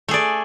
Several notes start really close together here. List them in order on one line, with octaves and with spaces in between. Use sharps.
A3 G#4 D5